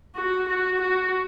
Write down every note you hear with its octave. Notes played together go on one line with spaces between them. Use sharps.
F#4
F#4
F#4